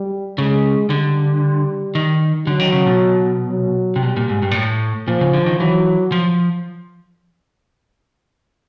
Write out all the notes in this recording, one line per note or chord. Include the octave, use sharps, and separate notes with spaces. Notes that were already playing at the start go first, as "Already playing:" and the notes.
Already playing: G3
C#3 G#3
D3 G3
D#3
D3 F#3
D#3
C#3
B2
F#3
C3
B2 G3
A#2
G#2
G2
A#2
A2
A#2 F3
C#3
D3
D#3
E3 F#3
F3